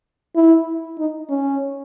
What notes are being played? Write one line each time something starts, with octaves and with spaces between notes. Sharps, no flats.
E4
D#4
C#4